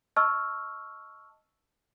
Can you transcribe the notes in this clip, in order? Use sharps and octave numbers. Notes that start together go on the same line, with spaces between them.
D#5 A5 C#6 E6 F6